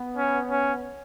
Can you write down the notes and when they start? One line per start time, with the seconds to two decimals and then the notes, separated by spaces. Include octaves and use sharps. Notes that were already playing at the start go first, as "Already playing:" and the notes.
Already playing: B3
0.17 C#4
0.50 C#4